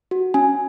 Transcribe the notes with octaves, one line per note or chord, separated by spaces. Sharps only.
F#4
C#4 G#5